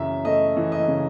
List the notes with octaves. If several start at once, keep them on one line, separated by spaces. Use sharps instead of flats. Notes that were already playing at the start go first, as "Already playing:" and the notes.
Already playing: F#2 C#3 E3 E5
A3 D#5
E3
D#5
C#3